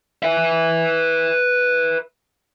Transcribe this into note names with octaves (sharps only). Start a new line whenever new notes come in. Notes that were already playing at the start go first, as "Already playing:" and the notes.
B4 E5